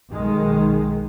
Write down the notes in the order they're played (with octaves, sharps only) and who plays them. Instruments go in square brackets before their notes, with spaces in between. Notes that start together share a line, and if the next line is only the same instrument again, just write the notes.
[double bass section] B1 D#3 G#3